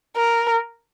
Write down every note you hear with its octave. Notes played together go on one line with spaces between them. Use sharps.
A#4